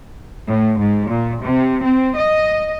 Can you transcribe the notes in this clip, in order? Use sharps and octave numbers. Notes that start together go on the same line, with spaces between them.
A2
G#2
A#2
C3
C4
D#5